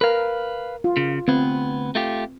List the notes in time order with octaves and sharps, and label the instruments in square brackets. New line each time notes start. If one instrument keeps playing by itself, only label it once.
[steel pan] A#4 [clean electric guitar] B4 F5
[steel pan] F4
[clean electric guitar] C#3
[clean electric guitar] D2 B3 [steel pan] C4 B4
[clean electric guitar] A3 F4 G4